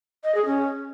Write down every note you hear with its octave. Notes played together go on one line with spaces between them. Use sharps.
D#5
G#4
C#4